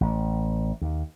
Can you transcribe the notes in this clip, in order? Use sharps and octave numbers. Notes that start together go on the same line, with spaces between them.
A1
D#2